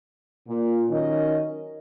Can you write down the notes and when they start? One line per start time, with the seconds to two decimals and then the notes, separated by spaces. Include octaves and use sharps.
0.47 A#2
0.89 D#3 F#3 C#4 A#4 D#5